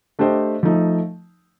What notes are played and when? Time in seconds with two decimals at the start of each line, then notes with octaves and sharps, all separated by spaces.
0.19 A3 D4 G4 C5 D#5
0.63 F3 A3 D#4